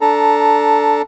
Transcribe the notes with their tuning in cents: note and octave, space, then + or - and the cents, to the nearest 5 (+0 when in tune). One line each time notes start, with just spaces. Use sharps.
D4 -10 A4 +0 A#5 +5